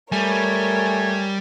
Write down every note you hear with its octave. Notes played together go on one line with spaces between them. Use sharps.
G3 A3 A#4 C#5 G#5